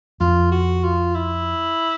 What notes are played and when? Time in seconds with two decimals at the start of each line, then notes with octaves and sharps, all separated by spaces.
0.21 F2 F4
0.52 F#4
0.84 F4
1.15 E4